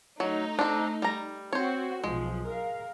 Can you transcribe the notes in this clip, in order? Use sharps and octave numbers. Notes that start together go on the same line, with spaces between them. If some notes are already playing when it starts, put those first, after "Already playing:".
F#3 A3 D#4
C4 D4
G3 A#5
C4 F#4 C5 C#5
B1 F3 G#3
A#4 F5